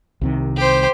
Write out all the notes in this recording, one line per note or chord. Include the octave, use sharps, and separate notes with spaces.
C2 C3 D#3
G4 C5